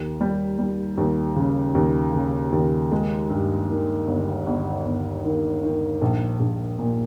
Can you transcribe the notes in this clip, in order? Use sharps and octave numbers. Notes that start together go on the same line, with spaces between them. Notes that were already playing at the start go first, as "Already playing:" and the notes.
Already playing: D#2
G3
G3
D#2
C#3
D#2
C#3
D#2
G#3
G2
D#3
G1
G1
G1
D#3
D#3
A#1
A#1
A#2